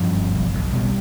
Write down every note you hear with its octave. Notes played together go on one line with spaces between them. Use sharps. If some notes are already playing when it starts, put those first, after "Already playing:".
Already playing: G2 F3
G1
B1
B1
B2 G3